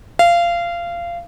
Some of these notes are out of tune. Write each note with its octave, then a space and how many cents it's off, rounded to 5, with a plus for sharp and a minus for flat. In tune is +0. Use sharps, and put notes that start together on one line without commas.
F5 -20